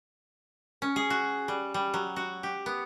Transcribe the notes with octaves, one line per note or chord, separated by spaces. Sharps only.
C#4
G#4
F#4
G3
G3
F#3
F#4
G4
B3